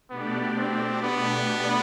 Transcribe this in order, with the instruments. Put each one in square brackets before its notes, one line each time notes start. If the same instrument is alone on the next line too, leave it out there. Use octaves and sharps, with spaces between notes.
[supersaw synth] B2 A3 D4 G4 D5 [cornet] B3
[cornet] C4
B3